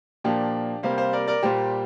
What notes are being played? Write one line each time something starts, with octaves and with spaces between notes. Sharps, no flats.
A#2 F3 A#3 D4 G4
C3 G3 A#3 C5 F5
C5 F5
A#4 D5
A#4 D5
A#2 G3 A#3 G4 C5